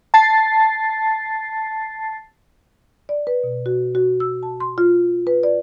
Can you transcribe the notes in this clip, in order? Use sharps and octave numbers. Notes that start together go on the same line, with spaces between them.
A5 A6 C7
D5
B4
B2
F#4
F#4
E6
A5
C6
F4
B4
D5